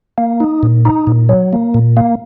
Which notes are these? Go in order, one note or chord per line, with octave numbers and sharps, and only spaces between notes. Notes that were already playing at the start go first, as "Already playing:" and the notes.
A#3
D#4
A#2
D#4
A#2
F#3
A#3
A#2
A#3